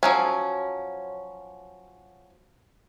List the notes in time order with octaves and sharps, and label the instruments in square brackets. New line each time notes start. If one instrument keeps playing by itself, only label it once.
[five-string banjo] F3 F#3 C#4